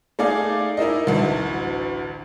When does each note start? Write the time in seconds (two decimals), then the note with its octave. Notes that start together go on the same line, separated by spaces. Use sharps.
0.19 A3 D#4 G#4 D5 F5
0.77 D#4 E4 A#4 D#5
1.07 A1 D2